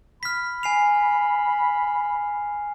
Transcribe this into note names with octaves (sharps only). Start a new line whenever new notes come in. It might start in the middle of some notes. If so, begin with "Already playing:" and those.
B5 F6 B6
G#5 C7 F7